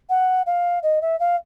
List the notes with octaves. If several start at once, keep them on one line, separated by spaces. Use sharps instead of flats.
F#5
F5
D#5
E5
F5